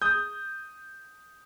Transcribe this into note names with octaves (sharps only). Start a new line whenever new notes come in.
D#6 G6